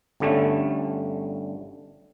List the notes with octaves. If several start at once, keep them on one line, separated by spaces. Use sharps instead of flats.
G1 D3 G3 A3 C#4